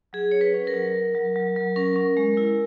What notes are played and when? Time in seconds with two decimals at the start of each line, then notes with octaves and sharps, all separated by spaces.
0.13 F#3 G#4
0.31 C#4 C#5
0.41 B4
0.54 C#4
0.67 A#4
0.74 F#3
0.95 F#3
1.15 F#3
1.36 F#3
1.56 F#3
1.76 C#4 A#4
1.96 C#4
2.17 G#3
2.37 E4